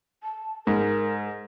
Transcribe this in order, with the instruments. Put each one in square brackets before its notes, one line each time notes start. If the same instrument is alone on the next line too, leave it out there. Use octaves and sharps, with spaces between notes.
[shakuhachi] A5
[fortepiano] G#2 [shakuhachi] A#4